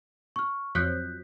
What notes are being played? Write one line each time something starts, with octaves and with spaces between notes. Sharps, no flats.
C#6 F6
F2 F3 F#3 F#6 G6 B6